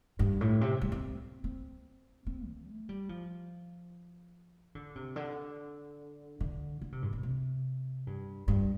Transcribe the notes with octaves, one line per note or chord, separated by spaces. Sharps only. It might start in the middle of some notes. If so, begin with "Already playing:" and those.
G2
A2
C3
G3
C4
C4
C4
D3
A3
G3
F3
D3
C3
D3
D3
D3
C3
G2
C3
C3
G2
G2